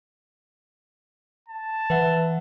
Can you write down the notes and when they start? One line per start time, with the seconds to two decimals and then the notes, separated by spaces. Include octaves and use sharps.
1.49 A5
1.90 E3 B4 E5 F#5